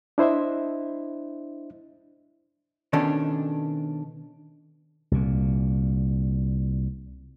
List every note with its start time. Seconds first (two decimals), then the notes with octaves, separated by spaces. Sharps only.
0.18 D4 E4 C5 D#5 E5
2.93 B2 D#3 C#4 D4 A4
5.12 C2 A#2